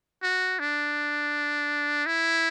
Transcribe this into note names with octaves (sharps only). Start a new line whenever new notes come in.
F#4
D4
E4